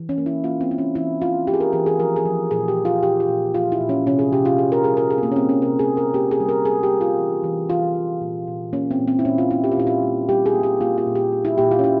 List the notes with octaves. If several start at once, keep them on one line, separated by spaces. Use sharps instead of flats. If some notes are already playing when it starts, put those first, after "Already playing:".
Already playing: E3
C#4
A#3
E4
A#3 F4
C4
A#3 E4
C#4
E3 E4
E3 F4
A#3 G4
G#4
A#4
E3 G#4
G#4
F3 A#4
G#4
F3
A#2 G#4
G4
F3
F4
A#2 G4
F4
A#2
F3 F4
E4
A#2
C#4
C3 C#4
G#4
C3 G4
F4
C3 G#4
A#4
G3 G#4
A#4
C3 G#4
C4
A#3
C#4
C3 C4
C#4
C3 A#4
G#4
A#3
A#4
A#3 G4
G#4
G3
A#4
G3 G#4
G4
G3
F4
E3
E3
E3 F4
E3
A#2
A#2
A#3 C#4
C4
A#2
C4
E4
A#2 C#4
F4
A#3 E4
G4
F4
A#2 E4
F4
G3
G3 G4
G#4
A#3
G4
A#3 F4
F4
A#2
G4
A#3
E4
A#2 G4
F4
C#4
A#2 E4